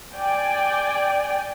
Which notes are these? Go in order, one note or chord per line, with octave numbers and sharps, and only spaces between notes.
D5 G5 G#5